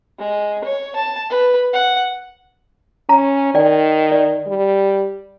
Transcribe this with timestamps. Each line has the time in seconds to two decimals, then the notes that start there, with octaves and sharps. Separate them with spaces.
0.19 G#3
0.64 C#5
0.96 A5
1.30 B4
1.73 F#5
3.09 C#4 A#5
3.55 D#3 D5 G5
4.12 D5
4.47 G3